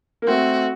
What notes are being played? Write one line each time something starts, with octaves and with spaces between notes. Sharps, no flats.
A#3
A3 C4 F#4